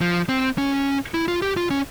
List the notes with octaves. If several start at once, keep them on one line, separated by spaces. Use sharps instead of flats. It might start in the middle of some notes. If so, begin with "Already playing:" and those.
F3
C4
C#4
E4
F4
G4
F4
C#4